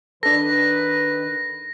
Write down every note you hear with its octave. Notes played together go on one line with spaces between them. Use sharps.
D#3 D4 A4 B4 A#6